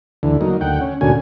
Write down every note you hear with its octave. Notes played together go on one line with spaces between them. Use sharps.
D2 D3 E3
F#3 A#3 D#4
D2 F#5 G5
C#4
D2 A#2 D3 C#4 F#4 G#5